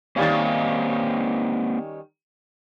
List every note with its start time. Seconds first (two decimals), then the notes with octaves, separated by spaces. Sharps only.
0.16 D#3 G3 A#3 C4 C#4 F5